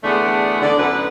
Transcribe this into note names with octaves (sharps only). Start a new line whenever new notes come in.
E2 D3 A3 B3 D4 G#4
D3 D5
F#2 A2 D3 B3 B4